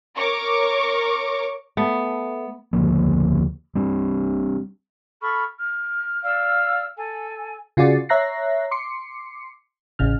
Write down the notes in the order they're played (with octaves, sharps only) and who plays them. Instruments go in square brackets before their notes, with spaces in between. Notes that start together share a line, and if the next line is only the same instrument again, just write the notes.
[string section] A#4 C#5 C#6 D6
[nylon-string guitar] A3 [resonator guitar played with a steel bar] B3
[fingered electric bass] D2 C#3 F3 A#3
G3 C4 D4
[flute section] A4 B5 C#6 F6
F6
D5 F5 E6 F6
A4 G#5
[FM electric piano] C#3 F4 F#4 G#4 D5 A6
C#5 E5 A#5 F#6 A#6 C7
C6 D6 C7 C#7
A1 C#3 F6